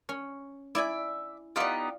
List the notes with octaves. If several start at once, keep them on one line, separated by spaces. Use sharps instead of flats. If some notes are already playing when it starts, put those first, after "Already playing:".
C#4
E4 D5 E5 G#5 D6
B3 D#4 F4 G4 D5